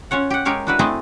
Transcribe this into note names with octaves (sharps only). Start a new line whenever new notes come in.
C#4 F4 C#5 F#5
G4 F#5
G#3 G4 A#4 C#5 F5
D4 E4 F#4 A#4 B4
A3 C4 E4 G#4 D#5 A5